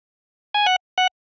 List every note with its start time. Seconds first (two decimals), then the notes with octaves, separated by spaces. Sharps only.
0.54 G#5
0.66 F#5
0.98 F#5